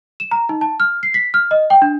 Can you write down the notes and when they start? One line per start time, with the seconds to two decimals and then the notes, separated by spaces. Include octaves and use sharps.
0.20 E7
0.31 A#5
0.49 D#4
0.61 A5
0.80 F6
1.03 C7
1.14 B6
1.34 F6
1.51 D#5
1.70 G5
1.82 D4